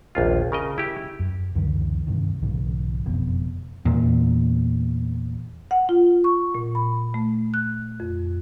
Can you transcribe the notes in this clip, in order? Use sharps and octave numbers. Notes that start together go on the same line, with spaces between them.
A#1 D#2 F4
C#3 A#4 D#5
E4 G4
F#2
C#2 F#2 D3 E3
G2 C3 D#3
B1 G#2 C#3 E3
F#1 F2 B2
E2 A#2
F#5
F4
C#6
A#2
B5
A3
F#6
F2